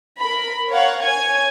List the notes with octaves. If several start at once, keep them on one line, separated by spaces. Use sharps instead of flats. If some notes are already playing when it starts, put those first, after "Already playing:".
A#4 B5
A#4 C#5 F5 F#5
C#5 G#5 G#6